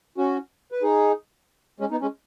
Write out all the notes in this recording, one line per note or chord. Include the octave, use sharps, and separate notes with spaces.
C#4 F#4
B4
D#4 G#4
G#3 C#4
B3 D#4
G#3 C#4